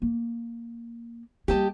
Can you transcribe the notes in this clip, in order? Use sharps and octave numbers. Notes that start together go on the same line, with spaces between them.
A#3
G3 A#3 G4 D#5 A5